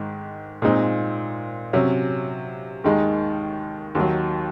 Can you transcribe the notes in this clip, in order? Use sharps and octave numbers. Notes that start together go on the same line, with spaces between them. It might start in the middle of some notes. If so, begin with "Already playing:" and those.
Already playing: G#2 D#3 G#3
A#2 G#3 C4 D#4
C3 F#3 C#4
D#2 D#3 G#3 D#4
D#2 D#3 F#3